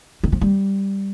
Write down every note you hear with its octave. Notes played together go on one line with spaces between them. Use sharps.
D#3
F3
G3